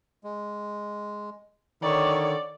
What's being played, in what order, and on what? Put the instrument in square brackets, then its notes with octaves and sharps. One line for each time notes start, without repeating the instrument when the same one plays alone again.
[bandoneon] G#3
[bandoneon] D3 [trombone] D#3 [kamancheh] C#5 D5